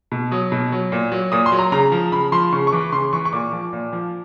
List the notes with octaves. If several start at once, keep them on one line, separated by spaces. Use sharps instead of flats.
B2
F#3 D#6
B2
F#3
A#2
F#3
A#2 D#6
C6
F#3
A#5
C#3 A#5
F3
C#3 B5
F3 C6
C#3 C#6
C#6
E3 D6
C#3 C6
E3 C#6
C#6
A#2 D6
F3
A#2
F3